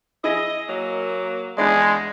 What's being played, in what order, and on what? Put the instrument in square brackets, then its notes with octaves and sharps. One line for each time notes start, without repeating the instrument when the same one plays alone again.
[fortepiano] E4 G#4 [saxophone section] D#5
[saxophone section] F#3 A#3
[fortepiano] E2 D4 [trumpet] G#3